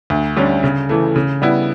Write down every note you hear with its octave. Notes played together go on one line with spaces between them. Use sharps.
D2
D3 G3 C#4
C#3
E3 A3
C#3
G3 B3 E4